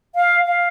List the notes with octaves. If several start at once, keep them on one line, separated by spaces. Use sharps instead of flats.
F5
F5